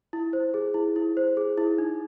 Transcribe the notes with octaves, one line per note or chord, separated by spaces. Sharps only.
E4
C5
G#4
E4
E4
C5
G#4
E4
D#4